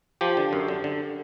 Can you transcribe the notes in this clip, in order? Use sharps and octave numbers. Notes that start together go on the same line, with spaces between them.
F3 G4
D3
F#2
D3
D3